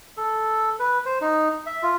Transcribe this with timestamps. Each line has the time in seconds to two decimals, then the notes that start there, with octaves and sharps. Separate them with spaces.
0.17 A4
0.79 B4
1.06 C5
1.21 D#4
1.66 E5
1.83 F4